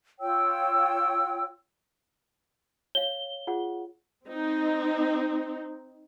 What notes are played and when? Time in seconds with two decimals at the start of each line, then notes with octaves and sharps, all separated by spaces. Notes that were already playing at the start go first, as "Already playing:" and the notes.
0.20 F4 C#5 G5 E6
2.95 C#5 F5 G7
3.47 F4 G#4 F#5
4.25 C4 D#4